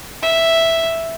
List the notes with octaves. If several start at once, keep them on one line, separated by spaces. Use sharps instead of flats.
E5